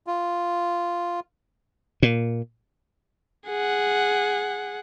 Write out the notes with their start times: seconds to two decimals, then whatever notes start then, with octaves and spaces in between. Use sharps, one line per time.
0.07 F4
2.03 A#2
3.47 G#4 F#5